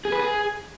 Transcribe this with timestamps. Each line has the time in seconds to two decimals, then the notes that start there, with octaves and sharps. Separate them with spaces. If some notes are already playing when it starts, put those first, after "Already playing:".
0.05 G#4
0.12 B4
0.19 G#4